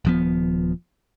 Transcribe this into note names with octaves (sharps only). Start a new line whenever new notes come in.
D#1 F3 B3